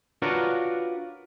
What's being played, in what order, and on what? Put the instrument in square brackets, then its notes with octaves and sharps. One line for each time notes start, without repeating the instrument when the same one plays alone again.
[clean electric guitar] D4 F4 F#4 A#4 B4 C#5